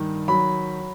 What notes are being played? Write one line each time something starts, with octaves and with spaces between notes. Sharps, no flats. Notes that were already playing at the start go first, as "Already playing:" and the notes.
Already playing: G2 D#3
F#3 B5